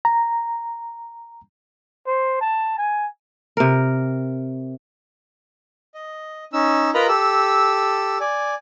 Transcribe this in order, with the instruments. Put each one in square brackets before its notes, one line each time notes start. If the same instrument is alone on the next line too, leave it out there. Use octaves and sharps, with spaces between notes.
[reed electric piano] A#5
[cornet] C5
A5
G#5
[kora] C3 A#4
[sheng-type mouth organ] D#5
C#4 D#4 E6
F4 A#4 B4 D#5 A#5 B5
G4 A4 E6
D5 G#5